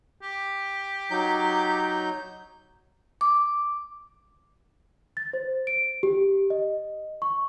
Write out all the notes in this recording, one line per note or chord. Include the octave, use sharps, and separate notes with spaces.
G4
F#3 D#4 G6
D6
A6
C5
D7
G4
D#5
C#6